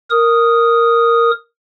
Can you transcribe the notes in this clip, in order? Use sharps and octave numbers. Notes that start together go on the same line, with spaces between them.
A#4 D#6